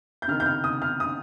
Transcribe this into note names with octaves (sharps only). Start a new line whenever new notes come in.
G6
C3 D#3 F6
G6
F6
D#6
F6
D#6